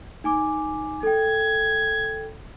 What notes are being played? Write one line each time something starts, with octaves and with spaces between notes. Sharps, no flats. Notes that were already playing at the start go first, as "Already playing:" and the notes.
D#4 G#5 D6
A4 G5 G#6